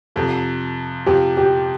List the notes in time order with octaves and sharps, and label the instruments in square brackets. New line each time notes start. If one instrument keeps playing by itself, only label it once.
[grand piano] F2 C3 F3 [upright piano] A4
[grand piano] F2 C3 F3 [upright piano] G4
[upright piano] G4